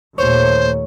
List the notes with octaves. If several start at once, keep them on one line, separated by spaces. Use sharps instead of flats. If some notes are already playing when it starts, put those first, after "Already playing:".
D#2 A#2 A3 C5 C#5